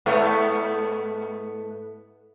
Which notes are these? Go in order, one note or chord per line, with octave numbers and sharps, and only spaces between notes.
G#2 A3 B3